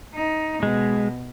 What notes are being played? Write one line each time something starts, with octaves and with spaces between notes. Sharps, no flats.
D#4
B2 G#3